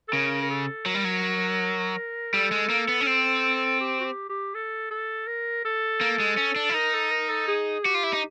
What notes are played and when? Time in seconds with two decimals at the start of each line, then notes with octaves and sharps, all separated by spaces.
0.08 A4
0.13 C#3 A#4
0.42 A#4
0.50 A4
0.86 F#3 A#4
0.95 G3
1.04 F#3
2.34 G3 A4
2.51 G#3
2.70 A#3
2.88 B3
3.01 C#4
3.07 C4
3.80 G4
4.00 F#4
4.04 G4
4.29 G4
4.54 A4
4.91 A4
5.27 A#4
5.65 A4
6.01 A#3
6.20 G#3
6.37 C#4
6.56 D4
6.69 E4
6.74 D#4 A#4
6.93 A4
7.11 A#4
7.29 A4
7.48 G#4
7.84 F#4 G4
7.95 F4
8.04 E4
8.13 D#4